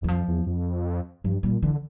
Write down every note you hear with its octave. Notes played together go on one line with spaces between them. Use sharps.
E2 E3
F2 F3
E2
F2
G2 F3
A#2 G3
D3 E3